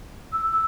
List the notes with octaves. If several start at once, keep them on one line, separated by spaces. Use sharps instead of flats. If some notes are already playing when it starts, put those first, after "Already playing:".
E6
E6